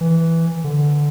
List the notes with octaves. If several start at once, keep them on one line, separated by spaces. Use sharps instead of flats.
E3
D3